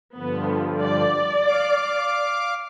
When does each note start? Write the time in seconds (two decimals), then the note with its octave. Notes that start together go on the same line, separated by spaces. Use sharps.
0.17 G2 D3 F3 B3
0.81 D5
1.43 F5 D6